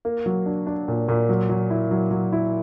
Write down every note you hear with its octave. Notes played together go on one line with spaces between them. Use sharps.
A#3
F#3
D4
D4
A#2
A#2
F#3
F#3
E4
F#3
F#3
E4